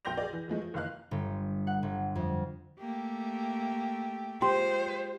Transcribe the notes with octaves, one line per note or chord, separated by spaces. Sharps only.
B1 G5 C6 G6 A#6 F7
G#4 D5
E3
E3 F3 G#3 A3
F3
F#1 D#3 E3 F5 F6 F#6
G1
F#5
G1
F2
A3 A#3 G4
G#3 F4 G4 C5 C6